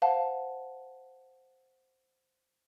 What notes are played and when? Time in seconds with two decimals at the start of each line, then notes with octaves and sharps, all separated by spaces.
0.02 C5 F5 F#5 A5